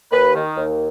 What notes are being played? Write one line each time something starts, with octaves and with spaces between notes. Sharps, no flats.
D#2 B4
D#3
D#2